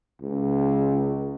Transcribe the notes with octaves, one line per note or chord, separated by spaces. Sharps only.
C#2